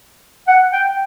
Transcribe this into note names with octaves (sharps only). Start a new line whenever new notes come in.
F#5
G5